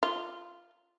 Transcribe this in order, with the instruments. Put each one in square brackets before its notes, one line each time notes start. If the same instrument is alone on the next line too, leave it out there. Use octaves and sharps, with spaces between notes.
[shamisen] F4